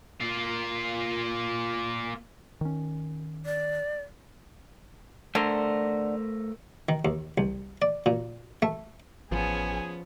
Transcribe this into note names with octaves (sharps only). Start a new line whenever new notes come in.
A#3 F4
D#3 C#4
D5
D3 A3 A#4 C5
D#3
D#2
C2
D5
A#2
A3
A1 F3 B3 C#4 G#4 G#5